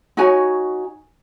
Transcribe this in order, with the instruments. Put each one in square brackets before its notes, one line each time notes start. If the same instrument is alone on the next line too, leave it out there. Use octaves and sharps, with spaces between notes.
[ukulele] D#4 F#4 C#5 G#5